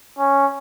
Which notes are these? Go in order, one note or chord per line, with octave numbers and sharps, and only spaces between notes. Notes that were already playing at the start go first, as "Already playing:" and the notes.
C#4